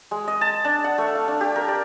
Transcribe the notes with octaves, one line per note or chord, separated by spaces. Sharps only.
G#3
D#5
A5
D4
F#5
A3
F5
D4
G4
A#4
D5